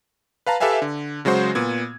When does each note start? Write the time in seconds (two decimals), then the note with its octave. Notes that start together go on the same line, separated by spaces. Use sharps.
0.47 B4 F5 A5 A#5
0.60 G4 A4 B4 E5 F5 G#5
0.82 D3
1.25 C#3 F#3 G#3 F#4 C5
1.55 A#2 B3 G#6